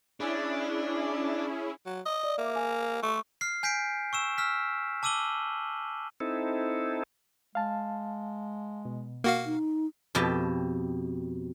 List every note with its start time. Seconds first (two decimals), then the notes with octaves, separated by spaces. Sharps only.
0.20 C#4 D4 E4 G#4
1.86 F#3
2.06 D#5
2.23 D5
2.38 A#3 E5 D6
2.56 G#5
3.03 A3 C6 C#6
3.41 F6 C7
3.63 G#5 G6 B6 C7 D7
4.13 C#6 E6 E7
4.38 E6 F6 B6
5.03 A5 D6 E6 D#7 F#7 G7
6.20 C4 D#4 E4 A4
7.55 G#3 F5 A5
8.85 B2
9.24 A#3 F#4 F5
9.46 D#4
10.15 F2 B2 G4 A5